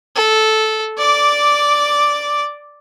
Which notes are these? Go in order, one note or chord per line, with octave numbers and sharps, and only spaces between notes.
A4
D5 D6